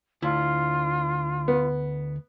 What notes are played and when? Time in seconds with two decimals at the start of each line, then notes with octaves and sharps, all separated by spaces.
0.22 D2 E4 F4
1.48 B3